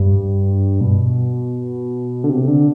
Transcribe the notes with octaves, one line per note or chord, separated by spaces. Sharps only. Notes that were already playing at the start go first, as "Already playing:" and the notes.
Already playing: G2
B2
D3
C3
D3